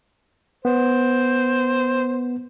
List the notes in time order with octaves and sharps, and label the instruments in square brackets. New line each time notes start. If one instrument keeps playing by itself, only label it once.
[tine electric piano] B3 [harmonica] C5